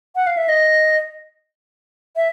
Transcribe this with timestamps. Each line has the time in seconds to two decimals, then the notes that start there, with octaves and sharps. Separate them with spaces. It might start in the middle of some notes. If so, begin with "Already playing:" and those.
0.16 F#5
0.27 F5
0.37 E5
0.49 D#5
2.16 E5